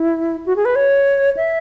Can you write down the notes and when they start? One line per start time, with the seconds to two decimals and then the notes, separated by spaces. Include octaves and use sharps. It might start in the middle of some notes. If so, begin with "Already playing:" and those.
Already playing: E4
0.46 F#4
0.56 G#4
0.65 B4
0.76 C#5
1.37 E5